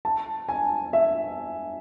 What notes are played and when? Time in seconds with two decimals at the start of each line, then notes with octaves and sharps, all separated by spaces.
0.05 A5
0.49 G#5
0.93 E5